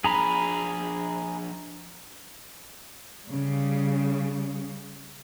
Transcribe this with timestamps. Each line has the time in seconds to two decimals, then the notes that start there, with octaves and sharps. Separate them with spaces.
0.04 F3 D4 G#4 G#5 A#5 B5
3.27 C#3 G3